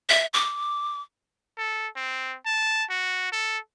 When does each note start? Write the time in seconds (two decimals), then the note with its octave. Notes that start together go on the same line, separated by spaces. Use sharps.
0.09 E5
0.34 D6
1.58 A4
1.96 C4
2.46 A5
2.90 F#4
3.32 A4